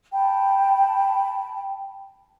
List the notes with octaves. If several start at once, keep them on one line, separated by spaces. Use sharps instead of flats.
G5 A5 B5